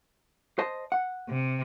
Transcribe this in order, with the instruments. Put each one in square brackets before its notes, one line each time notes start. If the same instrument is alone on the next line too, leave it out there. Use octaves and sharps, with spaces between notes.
[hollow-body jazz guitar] C5 D#5 A5
F#5
[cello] C3